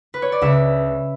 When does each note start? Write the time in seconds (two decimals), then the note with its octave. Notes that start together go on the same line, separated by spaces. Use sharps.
0.14 B4
0.22 C#5
0.32 D5
0.41 C#2 E5